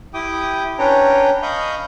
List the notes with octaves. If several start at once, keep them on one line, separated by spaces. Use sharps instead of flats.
E4 G4 G5 D6 D#6
C#4 D4 B4 C#5 G5 A#5
D#5 F5 B5 C#6 D#6 G6